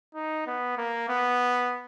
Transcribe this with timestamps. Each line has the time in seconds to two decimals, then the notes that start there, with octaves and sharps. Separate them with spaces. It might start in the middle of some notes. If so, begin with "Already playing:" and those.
0.15 D#4
0.47 B3
0.78 A#3
1.09 B3